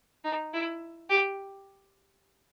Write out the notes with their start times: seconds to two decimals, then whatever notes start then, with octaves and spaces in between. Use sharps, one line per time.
0.24 D#4
0.53 E4
1.09 G4